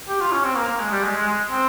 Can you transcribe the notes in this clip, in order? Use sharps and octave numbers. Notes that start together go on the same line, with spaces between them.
G4
F4
C#4
C4
A#3
A#3
G#3
G3
G#3
G#3
G#3
C4